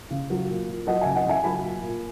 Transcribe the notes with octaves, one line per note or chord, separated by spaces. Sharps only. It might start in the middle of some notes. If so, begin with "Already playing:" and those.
C#3
F#3
A#2
A#2
F#3 D#5 F#5
C#3 E5 G#5
D#5 F#5
C#3 E5 G#5
F#3 G#5 B5
A#2
A#2